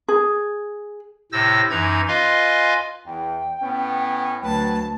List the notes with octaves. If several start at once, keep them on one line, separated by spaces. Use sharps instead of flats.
G#4
A2 C3 C5 E6 A6 A#6
F#2 E3 D#4 A#5 G#6
F4 B4 D#5 F5 G#5 C6
E2 G5
A2 B3 C#4
D2 F#3 B4 A5